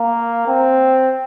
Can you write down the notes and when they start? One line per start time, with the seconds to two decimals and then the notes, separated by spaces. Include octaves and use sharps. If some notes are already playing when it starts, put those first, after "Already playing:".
Already playing: A#3
0.48 C4